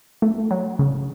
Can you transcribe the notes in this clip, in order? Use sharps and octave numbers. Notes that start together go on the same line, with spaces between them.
A3
F#3
C#3